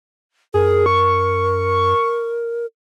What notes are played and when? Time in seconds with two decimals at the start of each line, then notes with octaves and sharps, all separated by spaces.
0.54 F#2 G#4 A#4
0.86 C#6